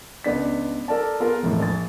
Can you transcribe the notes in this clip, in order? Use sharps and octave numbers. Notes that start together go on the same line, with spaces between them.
C#2 B3 D4 B6
A4 A#4 D5 A5
B3 F4 G#4 A#4
E1 F2 A2
A#1 A6